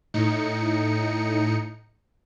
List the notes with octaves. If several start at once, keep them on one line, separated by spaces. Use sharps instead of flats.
A2 D#4 C#7